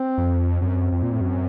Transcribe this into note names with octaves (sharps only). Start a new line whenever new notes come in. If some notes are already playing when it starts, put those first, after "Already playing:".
Already playing: C4
F2
F#2 C4
F2
A#2
A2
F#2